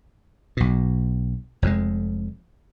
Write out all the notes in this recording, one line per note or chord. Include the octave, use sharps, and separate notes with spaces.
B1 B2
F1 F2 C3 G#3